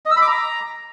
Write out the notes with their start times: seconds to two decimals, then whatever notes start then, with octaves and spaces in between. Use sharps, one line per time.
0.06 D#5
0.11 E6
0.16 B5
0.22 D6
0.27 A#5